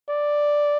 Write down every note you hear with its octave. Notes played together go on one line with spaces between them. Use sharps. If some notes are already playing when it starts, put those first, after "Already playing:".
D5